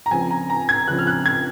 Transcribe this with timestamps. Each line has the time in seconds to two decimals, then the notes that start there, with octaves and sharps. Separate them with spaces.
0.06 A#5
0.11 C#2 C#3 F3 C4 G#5
0.31 A#5
0.50 A#5
0.69 G#6
0.88 C#2 C#3 F3 C4 F#6
0.99 F6
1.07 F#6
1.26 G#6